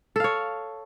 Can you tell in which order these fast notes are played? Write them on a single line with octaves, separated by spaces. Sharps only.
A4 F5 C#5